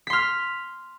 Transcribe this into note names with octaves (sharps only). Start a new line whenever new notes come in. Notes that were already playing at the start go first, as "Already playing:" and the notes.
C6 F6 B6